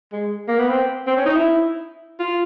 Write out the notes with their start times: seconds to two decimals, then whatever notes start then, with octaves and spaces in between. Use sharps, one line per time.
0.13 G#3
0.48 A#3
0.59 B3
0.69 C4
1.07 C4
1.17 C#4
1.25 D#4
1.35 E4
2.19 F4